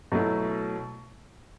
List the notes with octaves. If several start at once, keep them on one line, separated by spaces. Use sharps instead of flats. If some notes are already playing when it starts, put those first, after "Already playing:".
B2 F#3 A3 E4